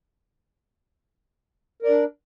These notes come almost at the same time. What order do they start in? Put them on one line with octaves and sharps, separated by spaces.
A#4 D5 D4